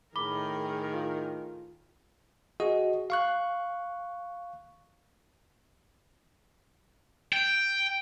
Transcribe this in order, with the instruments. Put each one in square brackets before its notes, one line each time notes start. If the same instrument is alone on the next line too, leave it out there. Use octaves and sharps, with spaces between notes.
[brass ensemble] A2 D#3 [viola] G#4 A#4 [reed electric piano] B5 [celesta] D6 G7
[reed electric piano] F4
[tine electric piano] F#4 G#4 D#5
F5 C#6 F#6
[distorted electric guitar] G5